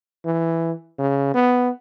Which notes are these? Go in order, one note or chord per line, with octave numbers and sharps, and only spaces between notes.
E3
C#3
B3